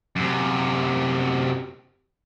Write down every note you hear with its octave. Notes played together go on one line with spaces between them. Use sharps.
F#2 C3